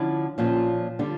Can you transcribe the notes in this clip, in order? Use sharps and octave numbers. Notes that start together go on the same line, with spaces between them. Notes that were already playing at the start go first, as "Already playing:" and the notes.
Already playing: D3 F3 C#4 E4
A#2 F3 C#4 F4
D3 G3 D4 F4